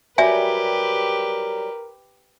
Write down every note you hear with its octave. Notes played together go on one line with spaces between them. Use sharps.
F#3 G3 G4 A#4 B4 D5 E5 G#5